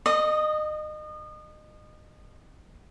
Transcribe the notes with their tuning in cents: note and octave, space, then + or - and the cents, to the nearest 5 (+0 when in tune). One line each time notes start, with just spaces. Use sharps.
D#5 -30 D#6 -5